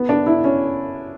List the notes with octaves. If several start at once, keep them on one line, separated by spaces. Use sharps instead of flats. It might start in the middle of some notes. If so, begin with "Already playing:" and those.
Already playing: B3
D4
E4
C#4